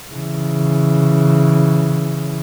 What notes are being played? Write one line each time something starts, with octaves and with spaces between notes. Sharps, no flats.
C#3 E3